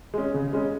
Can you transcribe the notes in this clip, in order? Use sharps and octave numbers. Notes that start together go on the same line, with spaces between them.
G#3 C#4
C#3
G#3 C#4